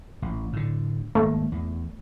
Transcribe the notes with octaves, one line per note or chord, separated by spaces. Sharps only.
A1
A2 D3
G#1 A3 A#3
E2